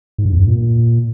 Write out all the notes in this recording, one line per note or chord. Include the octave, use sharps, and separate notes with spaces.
G#2
G2
E2
G2
A#2